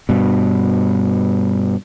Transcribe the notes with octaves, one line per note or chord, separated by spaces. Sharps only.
G2 B2